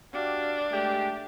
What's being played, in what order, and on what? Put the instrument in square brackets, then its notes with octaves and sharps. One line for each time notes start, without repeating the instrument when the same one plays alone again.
[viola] D4 [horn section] F#4 G4 F5
[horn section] G#3 A3 G4